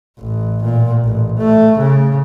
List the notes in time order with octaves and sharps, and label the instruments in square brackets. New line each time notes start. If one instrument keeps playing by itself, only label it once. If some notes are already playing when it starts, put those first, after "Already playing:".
[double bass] A1
A#2
A1
A3
C#3